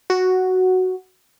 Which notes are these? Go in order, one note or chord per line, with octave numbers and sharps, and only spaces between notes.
F#4